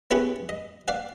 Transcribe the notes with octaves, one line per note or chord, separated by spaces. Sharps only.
B3 C#4 E4 G4 G#4 B4
D#5
D5 F5 F#5